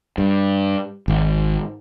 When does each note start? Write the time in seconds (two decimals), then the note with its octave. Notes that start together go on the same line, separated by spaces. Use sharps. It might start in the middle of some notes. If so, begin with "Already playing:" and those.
0.18 G2
1.08 G#1